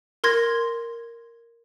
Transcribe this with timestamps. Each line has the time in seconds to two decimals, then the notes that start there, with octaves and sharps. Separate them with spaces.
0.24 A#4 C6 G#6 A#6